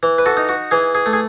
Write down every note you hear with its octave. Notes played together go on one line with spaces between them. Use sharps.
E3
B4
F#4 A4
D#4
F#4
E3 G#4
G#4
A3
G#4